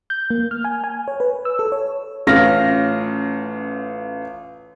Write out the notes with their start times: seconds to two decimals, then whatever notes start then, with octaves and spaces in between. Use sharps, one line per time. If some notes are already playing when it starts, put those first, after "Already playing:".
0.10 G6
0.30 A#3
0.51 F6
0.65 G#5
0.84 G#5
1.08 C#5
1.20 B4
1.45 E6
1.59 A4
1.72 C#5
2.27 A1 C#4 F4 F6 A#6